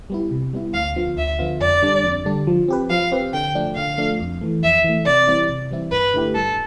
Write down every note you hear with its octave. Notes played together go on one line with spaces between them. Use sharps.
G3 B3 E4
C3
G3 B3 E4
D2 F5
D3 F3 B3 F4
D2 E5
D3 F3 B3 F4
F2 D5
D3 G3 D4
F2
D3 G3 D4
F3
C4 G4 B4
F3 F5
C4 G4 B4
D3 G5
F3 A3 D4
D3 F5
F3 A3 D4
F2
E3 A3
F2 E5
E3 A3
C3 D5
E3 G3 C4 E4
C3
E3 G3 C4 E4
G2 B4
D3 A3 E4 G4
G2 A4